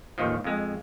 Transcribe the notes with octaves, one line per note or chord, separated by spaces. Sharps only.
A1 D#2 D#3 F3
F2 G#3